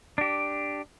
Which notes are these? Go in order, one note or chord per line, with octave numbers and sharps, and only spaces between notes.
D4 G4